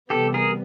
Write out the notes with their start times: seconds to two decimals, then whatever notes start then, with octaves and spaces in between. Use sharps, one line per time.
0.10 C3 E3 G3 B3 G4 A4
0.34 G#4 A#4